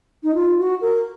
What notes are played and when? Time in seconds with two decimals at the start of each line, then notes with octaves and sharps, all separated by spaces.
0.24 D#4
0.34 F4
0.59 F#4
0.81 A#4